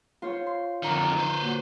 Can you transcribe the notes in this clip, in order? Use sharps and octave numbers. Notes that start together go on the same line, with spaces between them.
F4 C5 C#5
C6
F2 D3 D#3 A#5
B4 C5
A#2 F#4